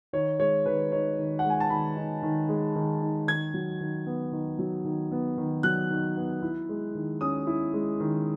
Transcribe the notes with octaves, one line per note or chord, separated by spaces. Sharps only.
D#3 C#5
G#3 C#5
D#3 B4
D#4 C#5
D#3
F#5
G#3
G#5
A5
D#3 B5
D#4
D#3
G#3
D#3
D#4
D#3 G#6
F#3
D#3
B3
D#3
F#3
D#3
B3
D#3
F#3 F#6
D#3
B3
E4
G#3
D#3
C#4 D#6
E4
G#3
D#3